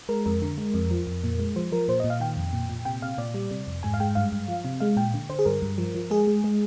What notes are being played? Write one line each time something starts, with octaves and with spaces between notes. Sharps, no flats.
G#3 A#4
F2 A#4
D3
G#3
F2
F3
F2
A#2
G#3
F3 C5
F3 A#4
A#2 C5
A#2 D#5
F5
D#3 G5
F2
A#2
A#2
C3 G5
C3 F5
A#2 D5
G3
C3
F2
G#2 G#5
F5
G#3 G5
G2 F5
G2
F3
C3
G#3 F5
A#2 G5
D3
D3 C5
G#4
G2 A#4
G2
F3
F3
G#3 G#4
G#3
G#3